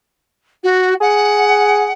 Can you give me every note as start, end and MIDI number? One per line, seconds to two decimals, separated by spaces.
0.63 0.94 66
1.01 1.91 68
1.01 1.92 78